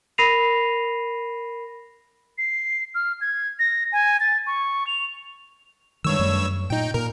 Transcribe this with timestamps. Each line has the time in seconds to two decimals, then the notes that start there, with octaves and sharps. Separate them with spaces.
0.18 A#4 B5 A#6 C7 D#7 F7
2.38 C7
2.95 F6
3.21 G#6
3.59 A#6
3.92 G#5
4.20 A6
4.47 C#6
4.87 F7
6.04 G2 D#3 G#3 C#5 E6
6.19 F#2 F#3 A3
6.70 A#2 D#4 G5
6.94 A#2 A#4